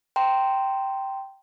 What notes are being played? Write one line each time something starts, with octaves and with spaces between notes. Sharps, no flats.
G5 A#5 C6